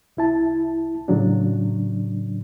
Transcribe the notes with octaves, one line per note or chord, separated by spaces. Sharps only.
C2 E4 A5
A2 C#3 F#3 D4